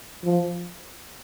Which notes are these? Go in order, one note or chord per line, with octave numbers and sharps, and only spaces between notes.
F3